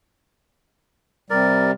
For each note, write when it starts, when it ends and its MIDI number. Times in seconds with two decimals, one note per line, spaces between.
1.30 1.72 48
1.30 1.72 55
1.30 1.71 70
1.30 1.71 74